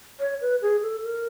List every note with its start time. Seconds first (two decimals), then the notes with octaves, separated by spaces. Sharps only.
0.20 C#5
0.41 B4
0.62 G#4
0.83 A4
1.03 A#4